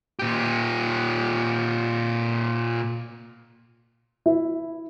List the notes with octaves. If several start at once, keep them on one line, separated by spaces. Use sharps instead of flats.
A#2 G4
E4